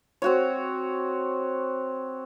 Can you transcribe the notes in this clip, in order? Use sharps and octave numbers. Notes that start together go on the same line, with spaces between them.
C4 F#4 C#5